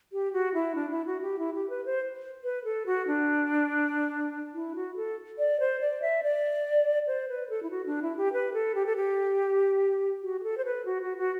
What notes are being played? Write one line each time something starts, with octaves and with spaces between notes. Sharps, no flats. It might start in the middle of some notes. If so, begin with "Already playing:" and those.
G4
F#4
E4
D4
E4
F#4
G4
E4
G4
B4
C5
B4
A4
F#4
D4
E4
F#4
A4
D5
C5
D5
E5
D5
C5
B4
A4
E4
F#4
D4
E4
G4
B4
A4
G4
A4
G4
F#4
G4
A4
C5
B4
F#4
F#4
F#4